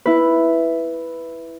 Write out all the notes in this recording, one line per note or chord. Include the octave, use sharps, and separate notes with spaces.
E4 B4